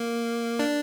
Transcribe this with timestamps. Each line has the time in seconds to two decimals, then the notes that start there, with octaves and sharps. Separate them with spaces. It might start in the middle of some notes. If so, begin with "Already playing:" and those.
Already playing: A#3
0.59 D4